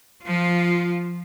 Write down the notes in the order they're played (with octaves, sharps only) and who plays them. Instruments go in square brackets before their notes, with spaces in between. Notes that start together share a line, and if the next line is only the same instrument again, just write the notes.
[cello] F3 F4